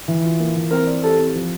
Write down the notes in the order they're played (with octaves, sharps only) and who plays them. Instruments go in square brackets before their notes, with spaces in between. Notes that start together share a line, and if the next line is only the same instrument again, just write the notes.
[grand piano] E3
F4
A#3
E3
[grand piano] C4 [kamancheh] A#4
[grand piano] D5
[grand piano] G4 [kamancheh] A4
[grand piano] C4
F3